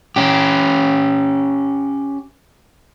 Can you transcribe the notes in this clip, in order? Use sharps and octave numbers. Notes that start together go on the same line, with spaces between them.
C#4 G4